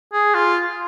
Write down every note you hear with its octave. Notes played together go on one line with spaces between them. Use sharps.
G#4
F4